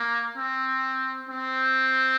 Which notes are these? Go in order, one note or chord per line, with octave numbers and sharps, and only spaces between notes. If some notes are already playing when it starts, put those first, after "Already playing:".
Already playing: A#3
C4
C4